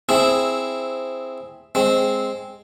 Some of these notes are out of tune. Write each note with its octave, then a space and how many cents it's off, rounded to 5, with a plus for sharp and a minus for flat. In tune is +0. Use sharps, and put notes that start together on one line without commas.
C4 +0 E4 +0 G#4 +0
G#3 +0 C4 +0